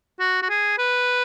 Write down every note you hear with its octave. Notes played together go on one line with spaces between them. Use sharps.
F#4
F#4
G#4
B4